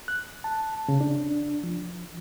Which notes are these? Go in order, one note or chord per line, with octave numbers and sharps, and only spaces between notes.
F#6
A5
C#3
D4
F3